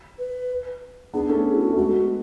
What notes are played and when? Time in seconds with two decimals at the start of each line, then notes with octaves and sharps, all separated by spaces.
0.19 B4
1.14 B3 D4 G#4
1.29 A3 C#4 A4
1.46 G#4
1.55 E4
1.61 F#4
1.73 A3
1.77 G#3 B3 F#4